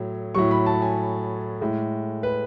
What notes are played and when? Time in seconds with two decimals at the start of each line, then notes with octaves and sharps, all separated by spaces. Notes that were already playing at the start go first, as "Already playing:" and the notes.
Already playing: A2 F#3
0.35 A2 F#3 C#6
0.51 B5
0.66 A5
0.82 G#5
1.61 A2 G#3
2.23 B4